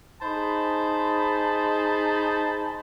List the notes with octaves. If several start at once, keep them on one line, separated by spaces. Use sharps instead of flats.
D#4 G#4 C5 A5 B5